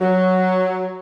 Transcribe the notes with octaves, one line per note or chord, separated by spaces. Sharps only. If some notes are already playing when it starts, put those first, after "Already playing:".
F#3